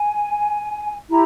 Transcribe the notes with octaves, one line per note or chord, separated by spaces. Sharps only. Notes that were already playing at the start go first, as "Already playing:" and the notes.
Already playing: G#5
E4 G4 A#5